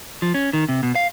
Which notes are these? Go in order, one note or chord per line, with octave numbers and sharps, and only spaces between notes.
F3
C#4
D#3
C3
B2
F5